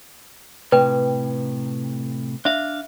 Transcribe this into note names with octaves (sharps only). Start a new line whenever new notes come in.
A2 C3 B4 G5
D4 E5 F5